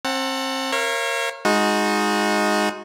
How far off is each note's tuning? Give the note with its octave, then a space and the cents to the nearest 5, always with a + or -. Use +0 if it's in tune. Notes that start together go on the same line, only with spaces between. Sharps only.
C4 +30 F#5 +0 A5 +35
A#4 +0 C#5 -30 F5 -45
G#3 +0 D#4 +5 F#4 -30